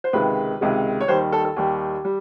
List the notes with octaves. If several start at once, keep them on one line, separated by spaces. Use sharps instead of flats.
C5
C#2 C3 D#3 G#3 B4
C#2 C3 D#3 G#3
C#5
D#2 D#3 G3 C5
A4
A4
D#2 D#3 G3 G4
G3